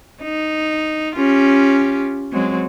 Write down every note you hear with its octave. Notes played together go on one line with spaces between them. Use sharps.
D#4
C#4 F4 G4
F#3 G#3 C4